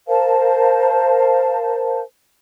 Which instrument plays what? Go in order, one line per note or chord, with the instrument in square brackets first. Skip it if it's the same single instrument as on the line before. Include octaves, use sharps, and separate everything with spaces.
[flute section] A#4 C5 F5 A5